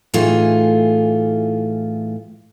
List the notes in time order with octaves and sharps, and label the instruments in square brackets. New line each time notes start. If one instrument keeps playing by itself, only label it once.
[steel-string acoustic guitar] A2 E3 A3 D#4 F4 G#4